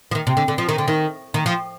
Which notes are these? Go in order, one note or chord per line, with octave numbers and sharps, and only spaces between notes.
F3
D#3
C3
D3
D3
F3
D#3
D3
D#3
D#3
F3